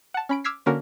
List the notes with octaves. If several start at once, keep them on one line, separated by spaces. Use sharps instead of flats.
F#5 A5
C#4 B5 D7
D6 E6 F6 G#6 B6 C7
D3 A#3 C#4 F#4 A#4